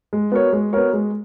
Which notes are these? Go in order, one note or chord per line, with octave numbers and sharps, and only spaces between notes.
G#3
B3 F#4 A#4 C#5
G#3
B3 F#4 A#4 C#5
G#3